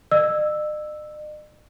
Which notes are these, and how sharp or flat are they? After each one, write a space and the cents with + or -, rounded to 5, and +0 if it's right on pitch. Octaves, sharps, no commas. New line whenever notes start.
D#5 -45 E6 +0